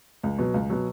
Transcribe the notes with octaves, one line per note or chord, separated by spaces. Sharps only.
C#2
B2 F#3
C#2
B2 F#3